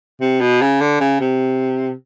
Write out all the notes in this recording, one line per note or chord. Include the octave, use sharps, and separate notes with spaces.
C3
B2
C#3
D3
C#3
C3